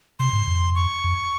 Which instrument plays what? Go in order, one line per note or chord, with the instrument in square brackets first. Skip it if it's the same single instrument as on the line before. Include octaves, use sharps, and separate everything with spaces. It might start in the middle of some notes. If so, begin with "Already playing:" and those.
[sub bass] C3 [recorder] C6
[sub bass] G#2
F2
[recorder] C#6
[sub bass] F2